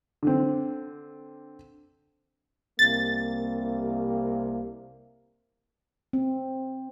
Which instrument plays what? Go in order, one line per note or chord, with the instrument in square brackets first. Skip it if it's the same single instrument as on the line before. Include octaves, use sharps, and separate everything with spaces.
[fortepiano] D3 C4
[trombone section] C2 C3 A#3 [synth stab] A6
[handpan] C4